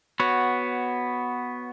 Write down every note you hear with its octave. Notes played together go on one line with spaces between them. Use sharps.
B3 F#4 C#5